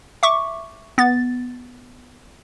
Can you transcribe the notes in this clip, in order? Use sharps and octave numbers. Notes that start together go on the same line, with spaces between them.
E5 C#6 D6
B3 A6